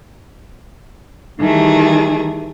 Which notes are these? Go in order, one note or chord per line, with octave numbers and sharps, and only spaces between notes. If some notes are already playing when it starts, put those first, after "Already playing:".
D#3 E3 G3 A3 G#4